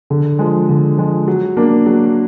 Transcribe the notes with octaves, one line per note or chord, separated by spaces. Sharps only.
D3
F3 G#3
D3
F3 G#3
F#3
A#3 D4
F#3